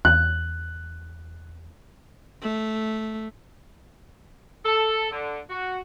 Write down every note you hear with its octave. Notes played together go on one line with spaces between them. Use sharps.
E2 F#6
A3
A4
D3
F#4